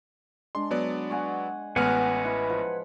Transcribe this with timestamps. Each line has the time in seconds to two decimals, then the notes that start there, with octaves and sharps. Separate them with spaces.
0.55 G#3 D4 C6
0.71 F#3 B3 D5
1.10 F#5 G#5 C#6
1.76 A1 G#3 B3 B4 F#5 G#5 F6
2.25 E3 B5
2.50 F3